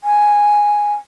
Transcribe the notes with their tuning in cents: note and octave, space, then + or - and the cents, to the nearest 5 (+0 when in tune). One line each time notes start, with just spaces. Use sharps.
G#5 -5